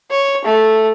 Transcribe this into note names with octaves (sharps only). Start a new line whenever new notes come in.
C#5
A3